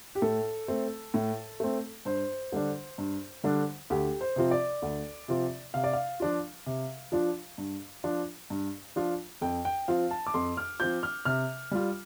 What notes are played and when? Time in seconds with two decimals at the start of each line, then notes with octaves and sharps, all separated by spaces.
0.15 G4
0.22 A2 A4
0.68 A3 C4
1.14 A2
1.60 A3 C4
2.05 G2 C5
2.52 D3 G3 D4
2.98 G2
3.44 D3 G3 D4
3.90 D2 G4
4.21 C5
4.36 C3 F3 C4 F4
4.51 D5
4.82 D2
5.28 C3 F3 C4 F4
5.74 C3 F5
5.84 D5
5.93 F5
6.20 F3 D4 F4
6.66 C3
7.12 F3 D4 F4
7.58 G2
8.04 F3 D4 F4
8.50 G2
8.96 F3 D4 F4
9.42 F2 G5
9.65 G5
9.88 F3 C4 F4 F5
10.11 A5
10.27 D6
10.34 F2 C6
10.57 F6
10.80 F3 C4 F4 G6
11.03 F6
11.25 C3 F6
11.71 G3 F4